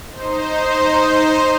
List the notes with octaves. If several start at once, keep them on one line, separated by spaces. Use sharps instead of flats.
D#4 C5